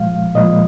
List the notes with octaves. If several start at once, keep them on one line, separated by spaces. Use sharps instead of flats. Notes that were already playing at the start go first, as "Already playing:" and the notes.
Already playing: A#2 F3 G#3 F5
A#2 F3 G#3 D#5